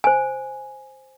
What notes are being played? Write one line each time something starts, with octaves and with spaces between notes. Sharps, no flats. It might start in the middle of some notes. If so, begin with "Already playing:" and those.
C5 G#5